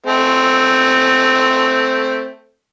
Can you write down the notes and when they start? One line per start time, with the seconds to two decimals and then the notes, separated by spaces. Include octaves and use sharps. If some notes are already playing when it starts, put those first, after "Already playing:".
0.07 A3 C4